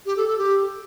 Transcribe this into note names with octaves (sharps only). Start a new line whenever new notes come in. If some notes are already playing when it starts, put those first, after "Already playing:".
G4
A4
A4
G4